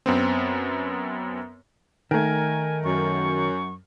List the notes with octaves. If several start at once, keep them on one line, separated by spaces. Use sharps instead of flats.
F#2 B3 C4
D#3 A3 A#4 G#5
F#2 C#6